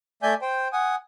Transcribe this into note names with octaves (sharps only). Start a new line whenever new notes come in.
A3 D5 E5 G#5 G6
C5 G5
F#5 G#5 D#6